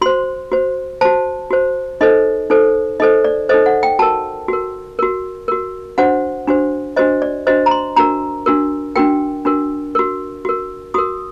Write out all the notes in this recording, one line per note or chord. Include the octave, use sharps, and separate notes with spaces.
F#4 C5 C6
F#4 C5
F#4 C5 A5
F#4 C5
D#4 A4 C5 D#5
D#4 A4 C5
D#4 A4 C5 D#5
D5
D#4 A4 C5 D#5
F#5
G5
F#4 A#4 A5
F#4 A#4
F#4 A#4
F#4 A#4
D4 F#4 C5 F#5
D4 F#4 C5
D4 F#4 C5 D#5
D5
D4 F#4 C5 D#5
A#5
C6
D4 F#4 A#4 A#5
D4 F#4 A#4
D4 F#4 A#4 G5
D4 F#4 A#4
F#4 A#4
F#4 A#4
F#4 A#4 D#6